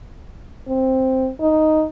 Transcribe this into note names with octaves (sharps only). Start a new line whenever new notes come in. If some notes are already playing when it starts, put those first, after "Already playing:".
C4
D#4